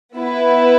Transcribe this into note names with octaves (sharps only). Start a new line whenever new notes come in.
B3 E4 B4